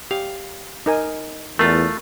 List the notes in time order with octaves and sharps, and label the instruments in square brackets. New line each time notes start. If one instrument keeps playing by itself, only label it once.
[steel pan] G4 [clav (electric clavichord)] F5
[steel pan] D#4 A#4 G#5
[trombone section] E2 [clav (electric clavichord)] A3 F4 [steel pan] A#4